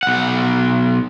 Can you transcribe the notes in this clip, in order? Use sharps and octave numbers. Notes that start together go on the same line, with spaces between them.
B1 F#5